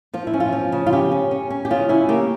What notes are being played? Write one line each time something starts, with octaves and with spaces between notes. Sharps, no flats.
F3 F4
E4
C#4
F4
F3
C#3
F4
C#4 G4
C#4
C#4
C#4
G4
C#3 F4
C#4 E4
A#3 G4